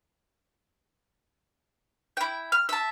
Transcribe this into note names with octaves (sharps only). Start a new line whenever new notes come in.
E4 G5
F6
E5 A5